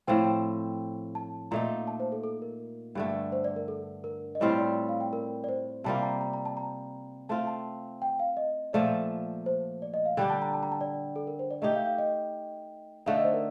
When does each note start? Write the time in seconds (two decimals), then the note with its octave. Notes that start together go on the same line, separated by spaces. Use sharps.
0.07 A2 F3 C4 G5
0.25 G5
1.15 A5
1.51 A#2 A3 D#4 A#5
1.87 A5
2.00 C5
2.12 A4
2.24 A4
2.42 A#4
2.95 G2 D3 A3
3.32 C5
3.44 D5
3.56 A#4
3.68 A4
4.04 A#4
4.35 D#5
4.40 A2 G3 C4 F4 D5
4.58 D5
4.89 F5
5.01 G5
5.13 A#4
5.44 D5
5.49 C5
5.84 C3 G3 A#3 F4 A5
6.03 A#5
6.21 A#5
6.33 A#5
6.45 A5
6.57 A#5
7.29 A3 C4 F4 A5
7.47 A5
8.02 G5
8.20 F5
8.37 D#5
8.73 A#2 F3 A3 D5
9.46 C5
9.82 D5
9.94 D#5
10.05 F5
10.17 D3 G3 D4 G4 G5
10.30 A5
10.42 A#5
10.53 A5
10.63 A#5
10.72 A5
10.81 D5
11.16 A4
11.27 A#4
11.39 C5
11.51 D5
11.62 A3 D#4 G4 D#5
11.75 F5
11.86 F5
11.99 D#5
13.06 D3 A3 D#4 F5
13.16 D#5
13.24 C5
13.34 A#4